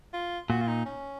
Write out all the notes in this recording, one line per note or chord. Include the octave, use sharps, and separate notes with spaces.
F4
A#2 F#4
F4
D#4
C#4